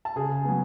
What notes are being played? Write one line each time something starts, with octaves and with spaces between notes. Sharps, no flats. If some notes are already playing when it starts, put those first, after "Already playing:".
A5
C#3 G#4 G#5
F#3 B3